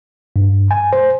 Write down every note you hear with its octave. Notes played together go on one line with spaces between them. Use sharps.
G2
G#5
C5